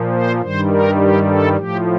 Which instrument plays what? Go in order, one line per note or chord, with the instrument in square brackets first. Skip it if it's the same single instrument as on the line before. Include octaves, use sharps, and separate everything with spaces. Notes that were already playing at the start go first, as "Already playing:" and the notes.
Already playing: [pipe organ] A#2 F3
C5
G2 D#3 G3 C5
A#4
G4
A4
A2 F3 G4